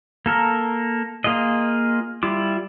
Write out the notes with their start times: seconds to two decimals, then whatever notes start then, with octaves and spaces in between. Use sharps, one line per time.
0.26 A#3 A4 A#4
1.24 A#3 F4 G#4 D#5
2.23 G3 E4 F4 D6